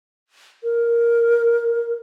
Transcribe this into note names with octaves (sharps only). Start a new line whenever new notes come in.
A#4